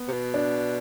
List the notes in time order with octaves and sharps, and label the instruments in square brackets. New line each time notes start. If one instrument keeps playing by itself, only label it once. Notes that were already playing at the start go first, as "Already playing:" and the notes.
Already playing: [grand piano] B3
[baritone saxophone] C3
B2
[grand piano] D4